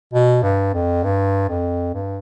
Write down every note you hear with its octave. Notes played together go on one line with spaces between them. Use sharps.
B2
G2
F2
G2
F2
G2